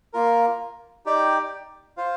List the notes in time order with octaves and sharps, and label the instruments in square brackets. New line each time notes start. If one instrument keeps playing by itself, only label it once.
[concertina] A#3 F4 A#4
D#4 G4 D5 G5
F4 C5 F5